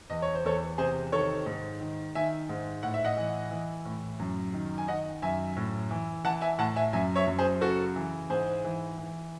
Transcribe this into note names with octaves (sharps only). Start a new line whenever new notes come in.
E2 D#5
C#5
C5
E2 A4 C#5
C3 G#4 C5
D#3 A4 C#5
G#2
D#3
D#3 E5 G#5
G#2
A2 F#5
E5
D#5 F#5
E3
E3
A2
F#2
D#3
G#5
D#3 D#5 F#5
F#2 E5 G#5
A2
E3
E3 F#5 A5
E5 G#5
A2 F#5 A5
E5 G#5
F#2 E5 G#5
C#5 E5
F#2
G#4 C5
C#3 F#4 A4
E3
G#2 G#4 C5
E3
E3